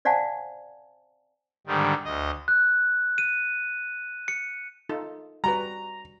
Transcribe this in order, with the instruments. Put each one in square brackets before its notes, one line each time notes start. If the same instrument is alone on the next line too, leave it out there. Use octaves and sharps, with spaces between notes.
[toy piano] C5 D5 F5 F#5 G#5 A5
[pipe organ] G#2 D3 D#3 G3
D2 D#5
[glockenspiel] F#6
D#7
C#7
[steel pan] D#4 F4 A4
[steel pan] G3 F#4 B4 [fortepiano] A#5